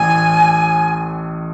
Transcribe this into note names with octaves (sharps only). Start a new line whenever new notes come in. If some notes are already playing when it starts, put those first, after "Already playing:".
Already playing: A1 A2 G#5